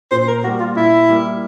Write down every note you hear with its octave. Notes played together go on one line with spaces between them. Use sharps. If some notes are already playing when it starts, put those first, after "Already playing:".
A#2 C5
A#4
G3 A#3 F#4
F4
A#2 E4
G3 A#3